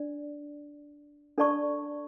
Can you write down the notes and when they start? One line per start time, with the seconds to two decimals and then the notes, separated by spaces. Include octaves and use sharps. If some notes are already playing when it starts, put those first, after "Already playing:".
Already playing: D4 D5
1.38 D4 A4 D5 A5 C#6